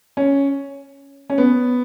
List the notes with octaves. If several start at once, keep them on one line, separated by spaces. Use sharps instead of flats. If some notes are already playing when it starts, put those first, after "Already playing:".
C#4
C#4
B3